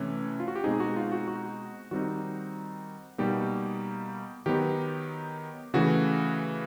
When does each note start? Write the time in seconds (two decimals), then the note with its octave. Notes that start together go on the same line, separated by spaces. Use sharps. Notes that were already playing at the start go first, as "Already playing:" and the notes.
Already playing: C3 E3 A3 C#4
0.40 F4
0.48 F#4
0.55 G4
0.64 B2 G#3 C4 D#4 G#4
0.80 F#4
0.96 F4
1.12 F#4
1.28 F#4
1.91 D#3 G3 C4 D#4 F#4
3.18 B2 G3 A#3 D#4 G4
4.46 D#3 F#3 B3 D#4 G4
5.74 C#3 E3 A3 F#4